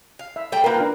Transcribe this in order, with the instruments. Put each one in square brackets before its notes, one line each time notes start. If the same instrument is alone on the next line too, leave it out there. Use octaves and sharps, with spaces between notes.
[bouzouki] F5
[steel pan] E5
[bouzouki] G3 A3 G5
[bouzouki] A#3 F4 [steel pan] A#4 B4 G5
[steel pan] D4 A#4